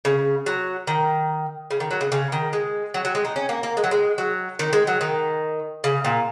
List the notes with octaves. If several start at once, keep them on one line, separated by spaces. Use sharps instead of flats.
C#3
F#3
D#3
C#3
D#3
F#3
C#3
C#3
D#3
G#3
F#3
F#3
G#3
D#4
C#4
A#3
A#3
G#3
F#3
G#3
F#3
D#3
G#3
F#3
D#3
C#3
A#2